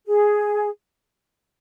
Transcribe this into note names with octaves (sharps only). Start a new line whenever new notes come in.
G#4